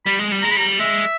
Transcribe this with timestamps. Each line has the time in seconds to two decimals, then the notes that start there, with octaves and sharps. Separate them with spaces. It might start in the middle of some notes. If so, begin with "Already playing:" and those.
0.06 G3 B5
0.19 G#3
0.32 G3
0.42 G#3 A#5
0.51 B5
0.57 G3 A#5
0.79 G#3 E5